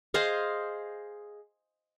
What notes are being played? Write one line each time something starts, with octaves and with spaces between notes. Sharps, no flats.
G#4 C5 D#5 F5